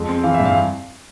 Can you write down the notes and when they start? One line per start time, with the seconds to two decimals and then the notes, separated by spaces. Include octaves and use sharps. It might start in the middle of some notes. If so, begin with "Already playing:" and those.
Already playing: F2 G#3
0.09 C4
0.24 E3 F5
0.34 E5
0.40 G2
0.45 F5